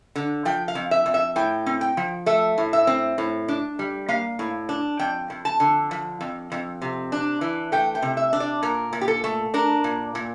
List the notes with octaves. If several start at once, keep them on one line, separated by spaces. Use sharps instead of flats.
D3
F3 G5
F5
F2
E5
F2
E5
A2 G5
C4
G5
F3
A3 E5
A2
E5
C4
A2
D4
G3
A#3 F5
A2
D4
F2 G5
F2
A5
D3
F3
F2
F2
C3
D4
E3
A3 G5
G5
C3
E5
D4
D5
A#2 A#4
A#2
G4
A4
A3
D4 A#4
A#2
A#2